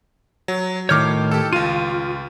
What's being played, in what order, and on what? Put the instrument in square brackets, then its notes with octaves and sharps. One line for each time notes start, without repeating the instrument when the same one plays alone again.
[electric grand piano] F#3
[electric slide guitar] A2 D#3 C#5 [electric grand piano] D6 F6 G6
[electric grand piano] G4 A4
[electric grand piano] C#2 F5 D#7 [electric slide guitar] F4